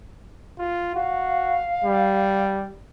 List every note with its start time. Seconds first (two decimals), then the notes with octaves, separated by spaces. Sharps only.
0.59 F4
0.95 F#4 F5
1.85 G3